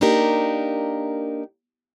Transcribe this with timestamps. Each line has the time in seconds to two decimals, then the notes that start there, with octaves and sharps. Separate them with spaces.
0.01 A#3 D4 D#4 G4 A#4